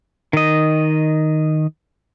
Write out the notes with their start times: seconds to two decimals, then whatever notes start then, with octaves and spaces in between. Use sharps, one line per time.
0.33 D#3 D#5